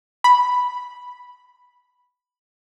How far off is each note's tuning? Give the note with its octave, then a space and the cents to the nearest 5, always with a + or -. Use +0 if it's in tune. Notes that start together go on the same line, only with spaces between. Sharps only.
B5 +0